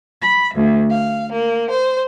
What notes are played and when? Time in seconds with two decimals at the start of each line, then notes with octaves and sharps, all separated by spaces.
0.22 B5
0.55 D2
0.90 F5
1.33 A#3
1.69 C5